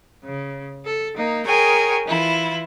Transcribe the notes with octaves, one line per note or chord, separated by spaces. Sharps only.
C#3
A4
A#3 D#4
G#4 A#4 C#5 G5 G#5
E3 E4 F4